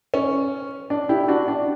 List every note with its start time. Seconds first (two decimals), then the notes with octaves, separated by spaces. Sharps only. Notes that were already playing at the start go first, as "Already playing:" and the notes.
0.14 C#4
0.90 D4
1.09 E4 G4
1.28 D4 F#4
1.48 D4